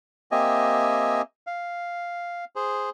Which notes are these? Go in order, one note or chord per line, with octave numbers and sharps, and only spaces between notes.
A#3 C4 G4 D#5 E5 G#5
F5
G#4 C5